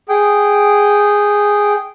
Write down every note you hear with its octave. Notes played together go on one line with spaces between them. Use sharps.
G#4 G5